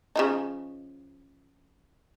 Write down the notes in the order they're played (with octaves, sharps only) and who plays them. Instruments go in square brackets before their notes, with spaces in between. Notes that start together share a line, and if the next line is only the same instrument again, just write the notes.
[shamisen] C#3 F3 D#4